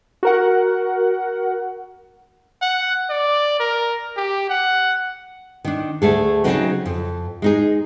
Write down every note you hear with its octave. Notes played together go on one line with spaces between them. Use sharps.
F#4 A#4 F#5
F#5
D5
A#4
G4
F#5
D#3 D4
D2 A3 G#4 A4
C#3 E3 F#3 C4 D#4 F#4
F2
G#3 D#4 G#4